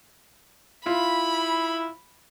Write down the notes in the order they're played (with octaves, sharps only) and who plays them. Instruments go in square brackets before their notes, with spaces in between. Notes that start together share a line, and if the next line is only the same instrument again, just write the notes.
[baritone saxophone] E4 [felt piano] F4 [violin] B5